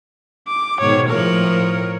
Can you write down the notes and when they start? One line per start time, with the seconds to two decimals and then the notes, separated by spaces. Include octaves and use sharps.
0.48 D6
0.81 G#2 B2 D#3 C#5
1.09 A2 F3 A#4 C#5